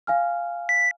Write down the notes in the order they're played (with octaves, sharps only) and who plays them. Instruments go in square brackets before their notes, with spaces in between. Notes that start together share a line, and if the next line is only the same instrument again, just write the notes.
[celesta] F5 G#5 F6
[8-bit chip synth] B6